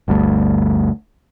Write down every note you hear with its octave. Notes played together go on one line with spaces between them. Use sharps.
G1 D2 G3 A3